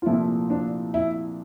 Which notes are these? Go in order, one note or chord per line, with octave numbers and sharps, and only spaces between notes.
F4
C2 A#2 F3 A3 E4
D4
E4